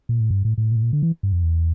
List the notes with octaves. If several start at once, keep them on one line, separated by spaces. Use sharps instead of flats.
A#2
A2
G2
A2
A2
A#2
A2
A#2
D3
E3
G2
F2
E2